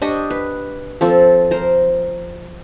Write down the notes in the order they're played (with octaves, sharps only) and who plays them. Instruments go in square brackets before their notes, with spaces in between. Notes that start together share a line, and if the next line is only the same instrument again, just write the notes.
[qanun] D4 G4 D#5 C#6
B4
F3 C4 A4
A#4 C5